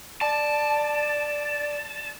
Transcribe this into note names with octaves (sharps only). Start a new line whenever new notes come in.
D5 A5